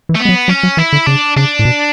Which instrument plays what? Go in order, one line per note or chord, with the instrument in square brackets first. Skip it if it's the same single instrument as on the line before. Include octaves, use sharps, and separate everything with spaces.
[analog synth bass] E3
[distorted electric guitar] A3
B3
[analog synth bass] G#3
F#3
[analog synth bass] F#3 [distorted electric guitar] C#4
[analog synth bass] F#3
[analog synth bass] E3 [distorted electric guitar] E4
[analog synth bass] D3
[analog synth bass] C#3 [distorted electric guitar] D4
[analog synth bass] C#3 [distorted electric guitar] D4
[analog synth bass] A2
B2